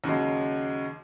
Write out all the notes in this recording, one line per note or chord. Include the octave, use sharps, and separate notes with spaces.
D#2 C#3 F#3 G#3